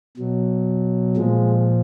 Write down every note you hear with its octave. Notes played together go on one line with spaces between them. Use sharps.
B2 F#3
A#2 F3 G#3